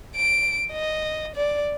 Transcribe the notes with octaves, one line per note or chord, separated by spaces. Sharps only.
D7
D#5
D5